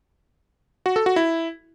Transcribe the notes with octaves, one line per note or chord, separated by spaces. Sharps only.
F#4
A4
F#4
E4